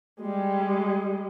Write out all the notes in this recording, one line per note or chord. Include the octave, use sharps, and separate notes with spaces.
G3 G#3